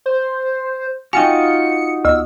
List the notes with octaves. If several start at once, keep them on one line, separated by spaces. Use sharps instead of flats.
C5
D#4 F4 F#4 G5 G#5 C#7
D2 E6